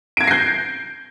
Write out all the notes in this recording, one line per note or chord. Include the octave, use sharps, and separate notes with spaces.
G6 G#6 A#6 C7 D7